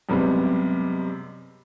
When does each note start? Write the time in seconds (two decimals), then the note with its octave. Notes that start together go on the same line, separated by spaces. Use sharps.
0.09 F#2 C3 G3 G#3 B3 C4